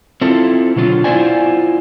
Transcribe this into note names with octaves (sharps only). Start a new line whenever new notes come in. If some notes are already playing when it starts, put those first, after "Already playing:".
C4 E4 F4 A4
B2 D3 F#3 F4
B3 E4 F4 C5 D5 G#5